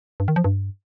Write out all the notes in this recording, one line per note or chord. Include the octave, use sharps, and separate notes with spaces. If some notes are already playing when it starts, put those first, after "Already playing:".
G2
D#3
F3
G2